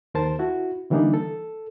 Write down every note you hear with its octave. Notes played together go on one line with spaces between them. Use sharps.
D#2 A#4 C5 A5
E4 F#4
D3 E3 G3 A#3 D4 D#4
A4